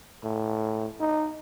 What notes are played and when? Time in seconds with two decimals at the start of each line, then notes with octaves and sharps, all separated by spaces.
0.24 A2
1.00 D#4